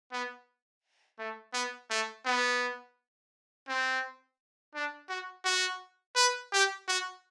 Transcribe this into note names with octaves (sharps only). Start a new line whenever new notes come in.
B3
A3
B3
A3
B3
C4
D4
F#4
F#4
B4
G4
F#4